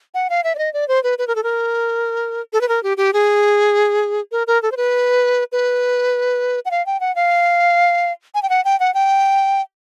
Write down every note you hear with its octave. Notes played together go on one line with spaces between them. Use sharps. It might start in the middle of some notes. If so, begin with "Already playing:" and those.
F#5
F5
E5
D5
D#5
D5
C5
B4
B4
A#4
A4
A#4
A4
B4
A#4
G4
G4
G#4
A#4
A#4
A4
C5
B4
B4
F#5
F5
G5
F#5
F5
G#5
G5
F#5
G5
F#5
G5